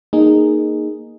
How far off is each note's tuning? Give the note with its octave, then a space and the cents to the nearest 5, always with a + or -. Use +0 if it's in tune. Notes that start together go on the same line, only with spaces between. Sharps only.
A#3 +0 D#4 -10 G#4 +0